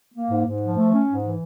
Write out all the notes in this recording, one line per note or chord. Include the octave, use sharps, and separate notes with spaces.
A#3
G#2
G#2
F3
A3
C#4
G#2
E3